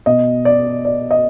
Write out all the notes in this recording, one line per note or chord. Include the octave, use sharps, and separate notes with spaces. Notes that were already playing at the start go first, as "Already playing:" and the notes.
B2 D#5
D5
D5
D#5